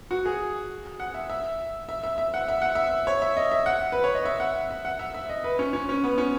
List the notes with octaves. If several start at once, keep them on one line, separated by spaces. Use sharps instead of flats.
F#4
G#4
F#5
E5
E5
E5
E5
E5
F#5
E5
F#5
E5
C#5
E5
D#5
E5
F#5
B4
C#5
D#5
E5
F#5
E5
F#5
E5
E5
D#5
B4
C#4
C#4
C#4
B3
C#4